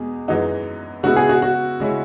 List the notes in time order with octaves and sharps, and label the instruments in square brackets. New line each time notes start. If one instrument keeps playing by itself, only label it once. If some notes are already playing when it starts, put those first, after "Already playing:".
Already playing: [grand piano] E2 B2 G#3 [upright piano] G#4
[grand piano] F#2 E3 G#3 D#4 F#4
[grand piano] C#3 G#3 B3 E4 [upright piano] F#4
[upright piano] G#4
F#4
F#4
[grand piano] C#3 G#3 C#4 E4